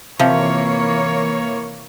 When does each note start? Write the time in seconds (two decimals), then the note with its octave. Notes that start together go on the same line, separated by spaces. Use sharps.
0.19 C3 E3 F3 A#3 C#5